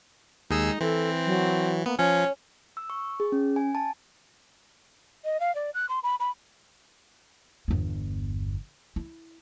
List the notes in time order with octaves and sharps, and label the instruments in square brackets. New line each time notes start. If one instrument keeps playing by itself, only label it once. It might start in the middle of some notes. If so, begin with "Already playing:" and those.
[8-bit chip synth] D#2 G#4 E6 [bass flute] G#3 [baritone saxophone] D#4
[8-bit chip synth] E3 [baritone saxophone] C4 [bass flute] A4
[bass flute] F#3
[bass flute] A#3 [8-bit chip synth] B3
[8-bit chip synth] F3 [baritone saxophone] C#4 [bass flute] C#5
[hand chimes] E6
C#6
G#4
C#4
G#5
A5
[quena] D#5
F5
D5
F#6
C6
B5
B5
[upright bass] G1 E2
E4